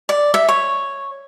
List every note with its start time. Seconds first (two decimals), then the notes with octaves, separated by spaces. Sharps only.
0.09 D5
0.34 E5
0.49 C#5